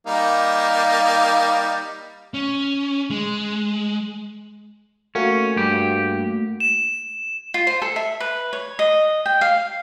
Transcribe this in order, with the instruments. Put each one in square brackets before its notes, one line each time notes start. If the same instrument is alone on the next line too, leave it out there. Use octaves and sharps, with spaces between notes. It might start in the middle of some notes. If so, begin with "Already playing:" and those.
[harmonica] G3 A#3 D#4
[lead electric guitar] C#4
G#3
[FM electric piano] A3 A#3 F#4 [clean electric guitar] C#4
[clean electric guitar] G2 G4
[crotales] E7
[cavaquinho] F4
C5
A4
E5
B4
C#5
D#5
G5
F5